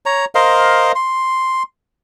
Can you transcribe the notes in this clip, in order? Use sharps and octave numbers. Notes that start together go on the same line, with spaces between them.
C#5 A#5
A#4 C5 D#5 F5
C6